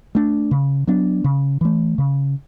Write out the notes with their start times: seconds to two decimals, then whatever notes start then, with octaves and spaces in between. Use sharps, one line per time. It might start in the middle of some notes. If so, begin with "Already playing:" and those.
0.15 A3 D4
0.51 C#3
0.87 F#3 B3 D4
1.24 C#3
1.61 E3 A3
1.98 C#3